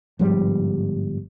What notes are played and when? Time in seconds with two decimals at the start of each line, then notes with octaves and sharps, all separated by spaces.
0.19 G1 G#2 F3 G3